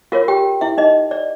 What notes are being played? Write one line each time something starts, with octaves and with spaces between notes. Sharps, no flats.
F4 F#4 A#4 C#5 F5
G4 G5
E4 E5
D#4 D#5
D5